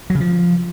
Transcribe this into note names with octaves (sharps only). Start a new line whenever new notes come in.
F#3
C#3
F3